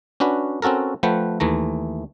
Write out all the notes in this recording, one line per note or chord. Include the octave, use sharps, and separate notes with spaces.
C#4 D4 F#4 B4
C4 C#4 F#4 A4 A#4
F3 A3 B4 F#5 G5
D#2 E3 A3 A#5